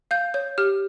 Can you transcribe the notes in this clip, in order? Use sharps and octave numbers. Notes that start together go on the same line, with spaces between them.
F5 G6
C#5 G6
G4 F6